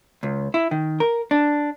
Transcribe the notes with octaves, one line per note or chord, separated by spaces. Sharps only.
C#2
E4
D#3
A#4
D4